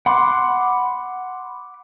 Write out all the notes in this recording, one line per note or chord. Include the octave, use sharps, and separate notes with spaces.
F#5 B5 C6 D6